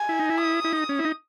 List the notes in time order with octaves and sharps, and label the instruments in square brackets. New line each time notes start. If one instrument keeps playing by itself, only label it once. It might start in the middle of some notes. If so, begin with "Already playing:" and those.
Already playing: [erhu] G#5
[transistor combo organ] E4
D#4
E4
[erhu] D#6
[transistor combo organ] E4
D#4
C#4
E4
D#4